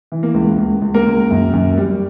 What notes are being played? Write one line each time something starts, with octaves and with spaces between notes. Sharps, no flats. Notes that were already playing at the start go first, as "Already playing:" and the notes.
E3
A#3
C#2
C#2
C#2
A#3 A#4
C#2
F#2
F#2
G3